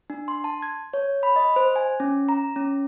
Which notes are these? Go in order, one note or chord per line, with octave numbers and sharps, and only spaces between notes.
D4
C6
A5
G#6
C#5
B5
D#5
C5
G#5
C#4
A#5
C#4